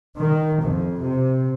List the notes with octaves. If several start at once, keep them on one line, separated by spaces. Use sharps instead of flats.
D#3
F2
C3